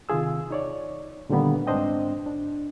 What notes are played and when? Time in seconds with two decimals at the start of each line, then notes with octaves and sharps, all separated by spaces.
0.09 C3 D#3 F4 G#4 E6
0.51 D#4 C#5 D5
1.29 A#2 D3 D#3 G3 A#3 B3
1.67 G#2 C4 D4 C5 D#5 G5
2.26 D4